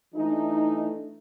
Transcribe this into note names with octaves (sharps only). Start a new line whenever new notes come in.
E3 A3 D4 D#4